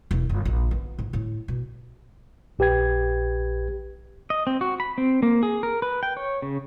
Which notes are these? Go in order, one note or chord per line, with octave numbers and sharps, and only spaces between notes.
E1
G1
A#1
B3
G#2
A2
B2
A#1 G4 B4 G5 G#6
D#5
C4
F#4
B5
C4
A#3
G#4
A#4
B4
G5
C#5
C#3